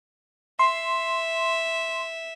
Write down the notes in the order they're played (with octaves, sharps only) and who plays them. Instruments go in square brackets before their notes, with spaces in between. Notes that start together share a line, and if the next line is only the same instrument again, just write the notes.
[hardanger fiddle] E5 [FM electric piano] C6